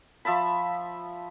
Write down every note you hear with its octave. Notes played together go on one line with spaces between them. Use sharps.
F3 E5 A5 B5